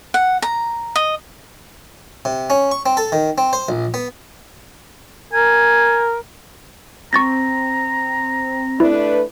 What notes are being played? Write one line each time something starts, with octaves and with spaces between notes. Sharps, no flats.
F#5
A#5
D#5
C3
C#4
C#6
C4
A4
D#3
C4
C5
A#1
B3
A#4 G#5
C4 A#5 C#6 A6 A#6
A3 D4 E4 B4